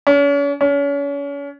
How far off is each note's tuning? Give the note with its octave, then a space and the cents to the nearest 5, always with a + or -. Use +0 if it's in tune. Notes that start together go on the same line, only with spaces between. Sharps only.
C#4 +40
C#4 +35